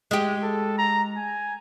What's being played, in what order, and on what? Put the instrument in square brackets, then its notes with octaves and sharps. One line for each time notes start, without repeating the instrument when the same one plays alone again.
[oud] G#3 G4
[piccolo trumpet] A4
A#5
G#5